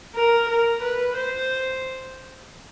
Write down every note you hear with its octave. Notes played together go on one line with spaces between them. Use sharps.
A#4
A#4
B4
C5